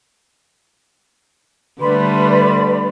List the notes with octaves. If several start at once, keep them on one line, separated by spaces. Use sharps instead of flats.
D3 G3 A3 B4 D5 B5 C6